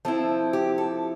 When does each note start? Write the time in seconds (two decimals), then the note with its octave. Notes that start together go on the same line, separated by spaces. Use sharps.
0.05 F3 C4 E4 A4
0.53 G4
0.78 A4